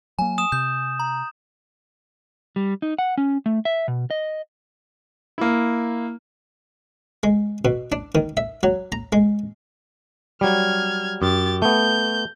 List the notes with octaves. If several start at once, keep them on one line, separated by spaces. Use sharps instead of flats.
F#3 A#3 G#5
D#6 E7
C3 G6
A#5
G3
D#4
F#5
C#4
A3
E5
B2
D#5
A#3 E4
G#3
B2
D4
D#3
E5
F#3
A#5
G#3
F#3 G3 F6 G#6
F#2 G4 A6
A3 B3 G6